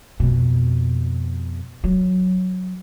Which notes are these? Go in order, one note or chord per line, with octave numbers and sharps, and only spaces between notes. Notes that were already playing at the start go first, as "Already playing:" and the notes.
F2 B2
F#3